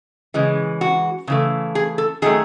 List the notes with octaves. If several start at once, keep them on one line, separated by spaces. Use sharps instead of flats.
C#3 E3 G#3
F#4
C#3 E3 A3
G#4
A4
D#3 F#3 A3 G#4